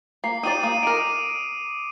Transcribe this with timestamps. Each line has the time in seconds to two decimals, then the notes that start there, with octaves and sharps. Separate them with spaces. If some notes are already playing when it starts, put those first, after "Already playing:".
0.24 A#3 C7
0.43 D#4 G4 D5 D#6 D#7
0.63 A#3 D#6 D#7
0.83 D#4 A#4 D6 D7